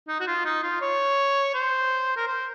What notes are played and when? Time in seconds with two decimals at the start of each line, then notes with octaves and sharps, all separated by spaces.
0.08 D#4
0.20 F#4
0.27 F4
0.45 D#4
0.63 F4
0.81 C#5
1.54 C5
2.16 A#4
2.27 C5